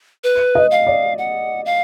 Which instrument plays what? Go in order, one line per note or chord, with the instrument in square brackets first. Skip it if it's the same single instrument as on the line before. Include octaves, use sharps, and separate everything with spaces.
[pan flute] B4
[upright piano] D#5
[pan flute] F5
[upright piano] D5
[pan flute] F#5
F5